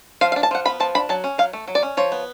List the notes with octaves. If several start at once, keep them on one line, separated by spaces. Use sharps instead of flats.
F3 F5
F5
D4
A5
F3 F#5
B3 B5
F3 A5
D4 B5
F#3 A5
C#4
F#3 F5
A3
F#3
D5
C#4
F3 C#5
B3